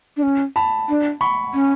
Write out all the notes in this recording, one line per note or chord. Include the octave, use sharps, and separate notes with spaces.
D4
C#4
A5 B5
D4
B5 C#6
C#4